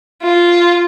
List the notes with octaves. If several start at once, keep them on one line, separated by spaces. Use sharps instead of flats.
F4